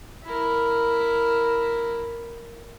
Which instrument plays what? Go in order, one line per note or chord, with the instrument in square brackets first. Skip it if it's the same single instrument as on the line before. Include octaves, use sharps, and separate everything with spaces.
[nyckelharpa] E4 A#4